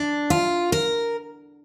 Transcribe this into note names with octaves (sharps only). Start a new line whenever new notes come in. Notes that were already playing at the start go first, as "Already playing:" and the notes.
Already playing: D4
F4
A#4